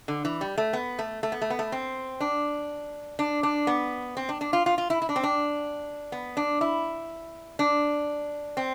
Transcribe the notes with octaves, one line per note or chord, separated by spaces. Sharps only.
D3
E3
G3
A3
B3
A3
A3
B3
A3
B3
A3
C4
D4
D4
D4
B3
C4
D4
D4
F4
F4
F4
E4
E4
D4
C4
D4
B3
D4
E4
D4
C4